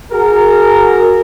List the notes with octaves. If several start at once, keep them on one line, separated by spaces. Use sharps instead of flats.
F#4 G#4 A#4